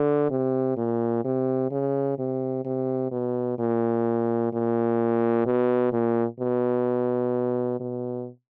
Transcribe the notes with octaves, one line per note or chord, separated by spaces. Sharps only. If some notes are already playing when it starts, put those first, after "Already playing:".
Already playing: D3
C3
A#2
C3
C#3
C3
C3
B2
A#2
A#2
B2
A#2
B2
B2